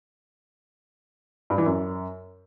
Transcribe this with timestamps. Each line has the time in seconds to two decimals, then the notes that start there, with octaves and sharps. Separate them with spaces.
1.50 G2
1.58 E3
1.66 F#2